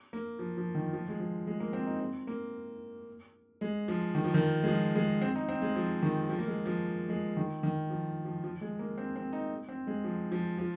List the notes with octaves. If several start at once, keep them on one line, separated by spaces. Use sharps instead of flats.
A#3
F3
F3
D#3
F3
G#3
F3
G#3
A#3
C4
D#4
C4
A#3
G#3
F3
D#3
F3
D#3
G#3
F3
G#3
C4
D#4
C4
G#3
F3
D#3
F3
A#3
G#3
F3
G#3
D#3
D#3
F3
F3
F3
G#3
A#3
C4
C4
D#4
C4
G#3
F3
F3
F3